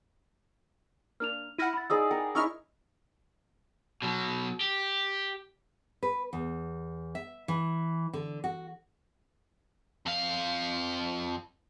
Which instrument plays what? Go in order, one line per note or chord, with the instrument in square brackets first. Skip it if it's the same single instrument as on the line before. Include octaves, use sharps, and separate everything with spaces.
[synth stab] A#3 D4 [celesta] F6 F7
[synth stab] E4 F#5 [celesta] F6 A#6 D#7
[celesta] B5 A6
[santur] D#4 G#4 D5 [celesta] E6
[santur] A#4 [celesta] G5 G#5
[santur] C#4 D#4 E4 [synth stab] C#6 F6 [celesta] E6
[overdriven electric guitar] B2 F#3
G4
[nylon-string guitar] B4
E2
E5
E3
D3
F#4
[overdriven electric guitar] F2 F5